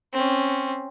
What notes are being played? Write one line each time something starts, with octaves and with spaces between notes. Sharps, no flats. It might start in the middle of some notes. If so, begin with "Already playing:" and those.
C4 C#4